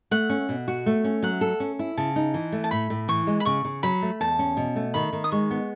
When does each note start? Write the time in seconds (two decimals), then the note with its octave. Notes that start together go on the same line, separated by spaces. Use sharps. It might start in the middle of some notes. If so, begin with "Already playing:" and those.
0.11 A3 F#5
0.30 C#4
0.49 B2
0.68 F#4
0.86 A3
1.04 C#4
1.22 F#3 F#5
1.41 A4
1.60 C#4
1.79 E4
1.97 C#3 A5
2.16 D#4
2.34 E3
2.52 A3
2.64 A5
2.71 A2 B5
2.90 A2
3.08 E3 C#6
3.27 G#3
3.40 B5
3.45 C#3 C#6
3.65 C#3
3.83 F#3 B5
4.02 A3
4.20 E2 A5
4.39 C#4
4.57 B2
4.76 A3
4.94 D#3 B5
5.13 D#3
5.24 D#6
5.32 G#3 C#6
5.50 B3